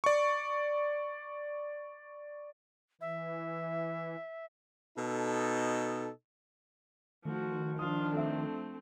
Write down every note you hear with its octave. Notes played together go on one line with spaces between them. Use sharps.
D5 C#6
E3 E5
B2 D#4 A4
D#3 F3 A3 F#4
F3 D4 F4 D#6
A3 C4 A4 E5